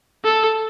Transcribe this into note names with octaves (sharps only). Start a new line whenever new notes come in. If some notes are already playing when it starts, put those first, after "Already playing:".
A4